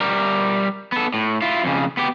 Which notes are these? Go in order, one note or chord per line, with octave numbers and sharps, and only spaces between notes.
G3 A#4
B3 A4
A2
E4 F4
F2 C#3
B3 G4